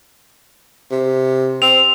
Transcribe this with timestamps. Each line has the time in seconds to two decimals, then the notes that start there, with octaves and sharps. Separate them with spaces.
0.91 C3
1.62 C4 F7